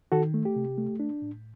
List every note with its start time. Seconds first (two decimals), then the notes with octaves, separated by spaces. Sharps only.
0.12 D#3 F#4 A4
0.34 A3
0.45 G4
0.56 C3
0.78 A3
1.00 D4
1.22 A2